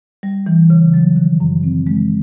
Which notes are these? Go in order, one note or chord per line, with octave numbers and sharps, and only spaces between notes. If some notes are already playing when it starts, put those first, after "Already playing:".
G3
E3
C#3
F#3
D#3
F#2
C4
G#3